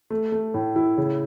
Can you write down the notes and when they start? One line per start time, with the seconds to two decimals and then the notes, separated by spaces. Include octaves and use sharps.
0.10 A3
0.32 A3
0.54 A2
0.76 E4
0.98 C#3